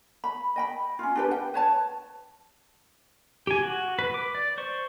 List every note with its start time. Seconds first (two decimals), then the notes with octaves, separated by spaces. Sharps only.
0.24 B5
0.56 D#5 G5 B5
0.99 C#4 F4
1.16 D4 G4 B4
1.31 G5
1.54 B4 C#5 A5
3.47 G4 G#5
3.62 F#4
3.99 B4
4.14 D6
4.35 D5
4.58 C5 C#6